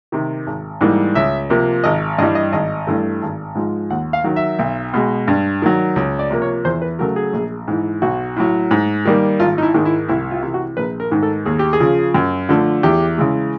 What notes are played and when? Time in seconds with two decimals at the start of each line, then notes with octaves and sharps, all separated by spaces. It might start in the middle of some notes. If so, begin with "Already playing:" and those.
0.12 C3 D#3
0.47 G#1
0.81 G#2 E3 G3 A#3
1.15 C#2 E5
1.50 C3 F3 A#3
1.84 G#1 D#5
2.18 G2 E3 G3 D#5
2.35 D#5
2.52 G#1 D#5
2.87 G2 E3 A3
3.22 G#1
3.55 G#2 F3 G#3
3.90 D#2 F#5
4.13 F5
4.24 D#3 F#3
4.36 E5
4.59 B1
4.94 B2 G#3
5.28 G2
5.62 D#3 F#3
5.96 C#2
6.19 D5
6.30 C3 F3 A#3
6.42 C#5
6.65 E2 C5
6.82 B4
6.99 C#3 F#3 A3 A#4
7.16 G#4
7.33 A#1
7.68 G#2 E3
8.02 B1 F#4
8.36 A2 F#3
8.71 G#2
9.05 D#3 G3 A#3
9.40 G#1 F4
9.58 D#4
9.62 E4
9.74 G#2 D#3 G#3
9.85 E4
10.08 C2 E4
10.31 F4
10.43 C3 E3
10.54 F#4
10.77 A#1 B4
11.00 A#4
11.11 G#2 D#3
11.23 A4
11.46 D#2 G#4
11.59 G4
11.73 G#4
11.80 C#3 F3
12.14 F#2
12.49 D3 F3 A3
12.83 E2 G4
13.18 C#3 E3 G#3